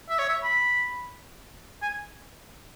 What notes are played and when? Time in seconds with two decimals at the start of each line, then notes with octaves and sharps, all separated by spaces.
0.09 E5
0.19 C#5
0.29 E5
0.44 B5
1.82 G#5